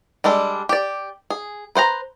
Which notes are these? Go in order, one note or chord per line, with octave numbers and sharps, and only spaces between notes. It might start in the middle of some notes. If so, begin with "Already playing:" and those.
G3 G#3 D4 A4
G4 D5
G#4
B4 C5 F#5 A#5